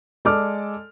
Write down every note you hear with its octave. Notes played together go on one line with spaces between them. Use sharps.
G#3 A4 D5 D6 F6